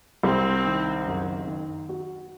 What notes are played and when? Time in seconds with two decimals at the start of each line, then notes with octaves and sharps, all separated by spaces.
0.23 C2 C4
0.65 D#3
1.06 F#1
1.48 D#3
1.89 F#4